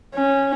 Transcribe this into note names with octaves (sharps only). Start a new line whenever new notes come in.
C#4